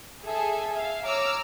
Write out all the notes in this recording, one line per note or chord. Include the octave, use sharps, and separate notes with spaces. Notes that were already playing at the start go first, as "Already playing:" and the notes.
G#4 A4 E5 G#5
E5 F5
C#5 A#5 D6 E6 F6